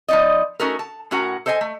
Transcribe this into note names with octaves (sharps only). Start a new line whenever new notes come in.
F3 B3 D#4 D5 D#5
A3 C#4 D#4 F#4 A4 A#4
A5
A2 C#4 F#4 A#4 F#5
A4 C5 D#5 G5 G#5
A3